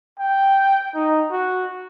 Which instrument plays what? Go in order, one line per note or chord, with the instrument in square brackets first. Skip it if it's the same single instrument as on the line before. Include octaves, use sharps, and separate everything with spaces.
[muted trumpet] G5
D#4
F#4